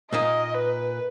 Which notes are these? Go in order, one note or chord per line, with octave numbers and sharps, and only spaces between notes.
A#2 A#3 D#4 D#5
B4